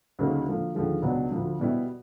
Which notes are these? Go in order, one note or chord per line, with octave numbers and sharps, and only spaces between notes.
D2 C#3 F#3 A#3 D#4
D3 F3 A#3
D#2 D3 F3 G#3
C#2 B2 F#3 B3 D4
D2 D3 F3
B2 G3 B3 E4